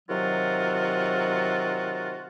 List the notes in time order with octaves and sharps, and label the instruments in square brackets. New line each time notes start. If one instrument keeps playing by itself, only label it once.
[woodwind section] C3 D#3 F#3 F4 F#4